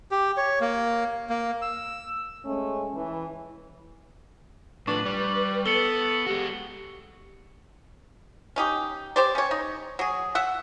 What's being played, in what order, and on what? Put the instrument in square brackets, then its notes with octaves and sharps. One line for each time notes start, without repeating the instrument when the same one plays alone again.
[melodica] G4
C#5
A#3
A#3
E6
[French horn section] G#3 A3 C#4
E3
[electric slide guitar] A2 F3 [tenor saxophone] D4 [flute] B4 [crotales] C#6 F#7
[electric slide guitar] G3 [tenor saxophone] D5
[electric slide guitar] B3 [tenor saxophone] A4 [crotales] C#7 F#7 G7
[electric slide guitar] G#3 F#4 [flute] G4
[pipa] C#4 D#4 G4
G4 C5 D5
C#4 C#5
D#4
F#3 G#4
E5 F#5